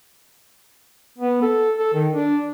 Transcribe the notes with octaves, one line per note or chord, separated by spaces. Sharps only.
B3
A4
A4
D#3
D4